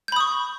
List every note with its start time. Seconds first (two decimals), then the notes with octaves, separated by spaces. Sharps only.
0.08 G6
0.12 B5
0.16 D#6
0.20 C#6